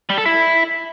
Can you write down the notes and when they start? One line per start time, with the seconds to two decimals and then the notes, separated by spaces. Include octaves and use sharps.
0.10 G3
0.18 A4
0.26 E4